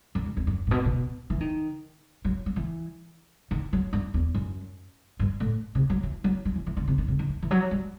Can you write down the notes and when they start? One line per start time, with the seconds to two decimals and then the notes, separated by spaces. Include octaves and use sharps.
0.15 F#2
0.25 G2
0.37 E2
0.47 F#2
0.67 A2
0.71 B2
0.85 B2
1.30 E3
1.40 D#3
2.25 F#3
2.46 F#3
2.56 E3
3.51 D#3
3.73 F#3
3.93 G2
4.14 E2
4.35 F#2
5.19 G2
5.40 A2
5.75 C3
5.90 F#3
6.03 E3
6.24 F#3
6.45 F#3
6.56 E3
6.66 E3
6.77 D#3
6.88 C3
6.98 D#3
7.08 C3
7.19 D#3
7.29 E3
7.42 E3
7.51 F#3
7.71 G3